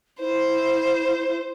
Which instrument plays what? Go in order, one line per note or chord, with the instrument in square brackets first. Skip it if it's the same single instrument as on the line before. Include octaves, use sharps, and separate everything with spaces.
[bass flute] E4 [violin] C5